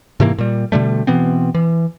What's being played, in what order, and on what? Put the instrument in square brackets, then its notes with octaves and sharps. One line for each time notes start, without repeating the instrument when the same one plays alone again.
[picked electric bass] G#2 C3 E3 A#3
A#2 G3
B2 D3 G3 A3
B2 E3 B3 C4
E3